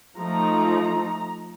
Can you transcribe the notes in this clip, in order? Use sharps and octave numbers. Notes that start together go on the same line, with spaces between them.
F3 A3 D#4 A#5